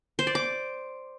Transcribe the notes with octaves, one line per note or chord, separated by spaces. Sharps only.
C5
D5
D6